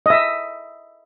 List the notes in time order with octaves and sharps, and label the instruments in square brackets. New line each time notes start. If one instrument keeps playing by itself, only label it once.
[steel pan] D#5 E5